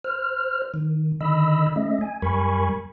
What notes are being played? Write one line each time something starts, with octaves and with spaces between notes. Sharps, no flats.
C5 F6
D#3
D3 D#3 D#5 B5 E6
A3 C#4 D#5 E5
G#5
F#2 G3 A#4 G#5 B5 C#6